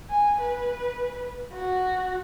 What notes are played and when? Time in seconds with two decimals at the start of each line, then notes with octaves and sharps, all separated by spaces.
0.10 G#5
0.41 B4
1.53 F#4